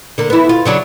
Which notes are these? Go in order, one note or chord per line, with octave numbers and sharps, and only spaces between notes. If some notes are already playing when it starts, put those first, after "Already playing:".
D3 A#3
B3 E4
F4
C#3 F#3 D4